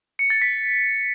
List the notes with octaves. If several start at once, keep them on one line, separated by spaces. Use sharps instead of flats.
C#7
A6
B6